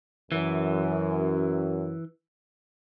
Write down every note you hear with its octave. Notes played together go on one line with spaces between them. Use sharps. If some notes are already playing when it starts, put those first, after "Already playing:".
F#2 E3